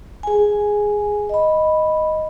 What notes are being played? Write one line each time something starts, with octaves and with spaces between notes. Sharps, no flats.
G#4 G#5
D#5 B5